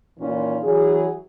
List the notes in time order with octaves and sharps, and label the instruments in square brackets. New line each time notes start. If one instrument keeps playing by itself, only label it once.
[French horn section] A#2 D#3 E3 C#4 F4
E3 F#3 G#4